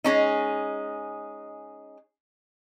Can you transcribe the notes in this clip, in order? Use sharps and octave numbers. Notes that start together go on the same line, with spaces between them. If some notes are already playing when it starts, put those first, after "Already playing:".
G#3 C#4 D#4